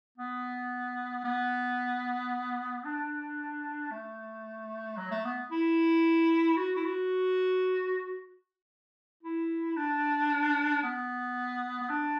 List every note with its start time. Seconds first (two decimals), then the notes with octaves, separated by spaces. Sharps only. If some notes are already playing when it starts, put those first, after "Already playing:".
0.18 B3
1.24 B3
2.85 D4
3.92 A3
4.97 F#3
5.11 A3
5.25 B3
5.51 E4
6.57 F#4
6.76 E4
6.85 F#4
9.23 E4
9.76 D4
10.83 B3
11.82 B3
11.89 D4